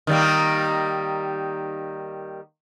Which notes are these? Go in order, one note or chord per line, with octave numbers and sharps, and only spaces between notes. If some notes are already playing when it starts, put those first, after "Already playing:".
D#3 G3 A#3